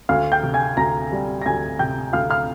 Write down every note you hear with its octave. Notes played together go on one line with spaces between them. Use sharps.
D2 F5 F6
G5 G6
C3
G#5 G#6
D2 A#5 A#6
G3
A#6
D2 G#5 G#6
C3 G5 G6
D2 F5 F6
F5 F6